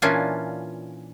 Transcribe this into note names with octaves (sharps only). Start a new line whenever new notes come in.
A#2 E3 C#4 D4 F4 G#5